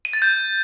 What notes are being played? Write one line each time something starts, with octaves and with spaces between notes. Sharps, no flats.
D#7
A6
G6